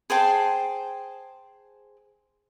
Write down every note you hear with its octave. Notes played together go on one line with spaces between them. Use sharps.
G#4 C5 G5 A5